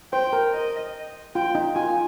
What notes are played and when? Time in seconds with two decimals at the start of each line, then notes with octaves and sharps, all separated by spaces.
0.13 C5 G5
0.33 A#4
0.54 D#5
1.35 F4 G5
1.55 D#4
1.75 F4 G#5